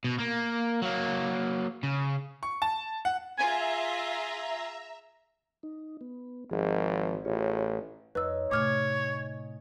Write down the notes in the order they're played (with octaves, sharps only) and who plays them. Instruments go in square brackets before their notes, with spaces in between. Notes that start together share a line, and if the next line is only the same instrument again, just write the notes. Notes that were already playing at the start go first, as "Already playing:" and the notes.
[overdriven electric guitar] B2
A#3
F#3 A#3
C#3
[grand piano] C#6
A5
F#5
[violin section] F4 G#4 [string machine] E5 A#5 [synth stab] G#5
[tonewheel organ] D#4
B3
[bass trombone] G#1 [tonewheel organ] F3 G#4
[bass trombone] A1 [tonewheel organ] F4 G#4 C#5
[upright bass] F2 [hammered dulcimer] D#4 C#5 D#5 [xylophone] B4 E6
[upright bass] A2 C3 [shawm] C#5 [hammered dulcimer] G#5 [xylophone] D6 F6 G#6